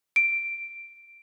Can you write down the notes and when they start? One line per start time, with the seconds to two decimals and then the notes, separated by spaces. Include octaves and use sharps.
0.16 D7